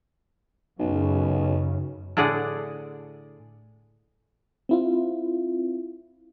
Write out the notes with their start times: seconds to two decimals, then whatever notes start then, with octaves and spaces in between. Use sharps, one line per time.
0.79 B1 F#2 C#3
2.17 A2 D3 G#4 D5 F#5
4.69 C4 E4 F4